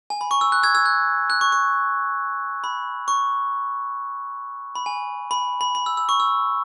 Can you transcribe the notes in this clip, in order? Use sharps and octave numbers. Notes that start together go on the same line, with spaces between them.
G#5
B5
C#6
E6
F#6
E6 G#6
E6 G#6
F#6
F#6
C#6
C#6
B5
C#6
B5
G#5
B5
B5
B5
E6
E6
C#6
E6